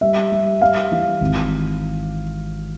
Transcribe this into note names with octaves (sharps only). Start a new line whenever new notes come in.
G3 E5
G3
G3 F5
E3
G#1